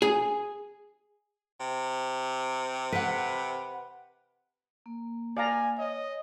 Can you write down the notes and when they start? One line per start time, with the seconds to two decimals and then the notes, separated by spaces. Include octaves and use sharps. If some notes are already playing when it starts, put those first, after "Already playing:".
0.02 G#4
1.60 C3
2.92 B4 F#5
4.86 A#3
5.37 D5 F5 G#5 A#5
5.78 C#5 D#5